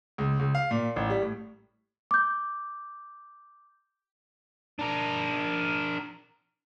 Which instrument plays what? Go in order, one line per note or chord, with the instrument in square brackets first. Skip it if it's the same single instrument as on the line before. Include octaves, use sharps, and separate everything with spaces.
[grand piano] C#2
C#2
F5
A#2
A1
G3
A2
[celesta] D6 G6
[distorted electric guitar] D4 A#4